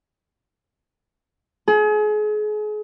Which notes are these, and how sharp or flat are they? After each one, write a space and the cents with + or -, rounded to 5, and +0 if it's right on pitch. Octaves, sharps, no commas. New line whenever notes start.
G#4 +35